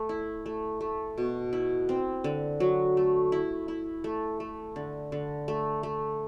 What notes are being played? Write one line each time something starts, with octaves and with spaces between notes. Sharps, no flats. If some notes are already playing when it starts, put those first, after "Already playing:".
Already playing: A3
E4
A3
A3
B2
E4
C4
D3
F#3
A3
E4
E4
A3
A3
D3
D3
A3
A3